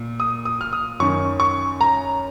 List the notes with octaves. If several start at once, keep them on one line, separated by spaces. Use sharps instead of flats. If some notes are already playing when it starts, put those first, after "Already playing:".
Already playing: A#2
D#6
D#6
F6
D#6
F#2 D#3 C#6
C#6
A#5